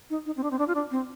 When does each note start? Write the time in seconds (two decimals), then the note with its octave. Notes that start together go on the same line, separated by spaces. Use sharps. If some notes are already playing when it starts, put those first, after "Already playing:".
0.10 D#4
0.26 D#4
0.37 C4
0.43 D4
0.51 C4
0.59 D4
0.68 F4
0.75 D4
0.91 C4